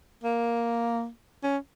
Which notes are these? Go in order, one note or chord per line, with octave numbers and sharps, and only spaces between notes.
A#3
C#4